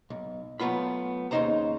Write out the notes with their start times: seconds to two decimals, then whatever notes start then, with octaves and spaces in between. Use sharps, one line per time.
0.10 B1
0.60 F#3 A3 B3 F4 B5
1.31 D#2 C#3 G#3 D#4 C5 A#5